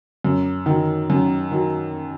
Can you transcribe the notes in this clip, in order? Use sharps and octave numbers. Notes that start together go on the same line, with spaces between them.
F#2
D#3 F#3
F#2
D#3 F#3